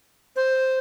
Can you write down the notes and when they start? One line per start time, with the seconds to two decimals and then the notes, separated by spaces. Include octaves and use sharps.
0.36 C5